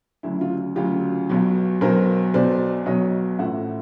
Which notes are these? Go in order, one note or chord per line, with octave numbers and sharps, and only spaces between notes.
D2 C#3 F#3 E4
F4
D2 C#3 F#3 F4 G4
B1 B2 F#3
B1 B2 F#3 A#4 C5
B1 B2 F#3 C5 D5
B1 B2 F#3 C#5 D#5
A1 A2 F3 E5 F#5